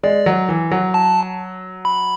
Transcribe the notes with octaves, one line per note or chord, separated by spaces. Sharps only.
G#3 D5
F#3
E3
F#3
A5
B5